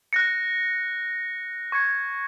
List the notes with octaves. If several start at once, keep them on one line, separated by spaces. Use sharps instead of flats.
F#6 A#6 C#7
C#6 G#6 C#7